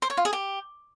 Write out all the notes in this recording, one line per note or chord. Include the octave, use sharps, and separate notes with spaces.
C5
C#5
F4
G#4
G4